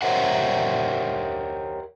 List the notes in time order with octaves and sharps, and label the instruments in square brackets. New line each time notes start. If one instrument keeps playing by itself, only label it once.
[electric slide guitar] G4 A#4 C5 C#5 E5 F#5